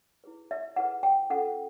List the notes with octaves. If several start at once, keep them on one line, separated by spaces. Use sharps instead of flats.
E4 G#4 B4
E5
E4 G#4 B4 F#5
G5
C#4 F4 A4 F#5